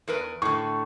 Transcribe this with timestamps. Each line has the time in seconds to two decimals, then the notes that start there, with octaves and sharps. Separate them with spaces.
0.08 E2 A#4 B4
0.42 A2 D3 C#6